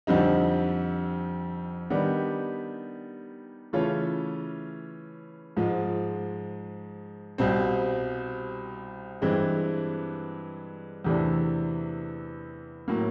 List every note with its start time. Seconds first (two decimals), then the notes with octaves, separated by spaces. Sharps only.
0.07 F2 D3 G3 C4 D#4
1.90 D#3 G3 B3 D4 G4
3.73 C#3 E3 A3 C#4 F4
5.57 G#2 F3 G#3
7.38 C2 B2 G3 C4
9.22 G2 E3 G#3 C4
11.04 E2 C3 E3 A3 D4
12.88 A2 F#3 A#3